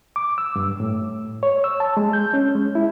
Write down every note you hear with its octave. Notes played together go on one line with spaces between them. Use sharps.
D6
E6
G2
A2
C#5
E6
A5
G#3
G6
C#4
G#3
E4